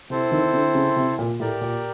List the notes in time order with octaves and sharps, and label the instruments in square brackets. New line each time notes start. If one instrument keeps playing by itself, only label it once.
[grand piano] C3 [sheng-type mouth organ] C4 E4 A4 C5
[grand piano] D#3
D3
C#3
C3
A#2
[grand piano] A2 [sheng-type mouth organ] G4 A#4 D5
[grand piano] A#2